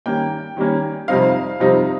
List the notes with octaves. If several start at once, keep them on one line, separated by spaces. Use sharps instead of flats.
D#3 G3 A#3 C#4 G5
D#3 G3 A#3 C#4
F2 C3 G3 C4 D#4 F5
F2 C3 G3 C4 D#4